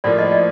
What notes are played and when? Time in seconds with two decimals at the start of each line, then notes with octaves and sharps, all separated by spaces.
0.04 A2 F3 A#3 F4 D5
0.18 D#5
0.32 D5